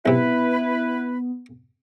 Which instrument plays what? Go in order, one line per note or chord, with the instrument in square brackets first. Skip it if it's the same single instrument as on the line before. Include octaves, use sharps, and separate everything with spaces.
[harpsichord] B1 C3 [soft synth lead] B3 [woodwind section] E4 B4